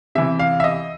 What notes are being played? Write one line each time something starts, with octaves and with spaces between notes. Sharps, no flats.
C3 E3 E5
F5
E5
D#5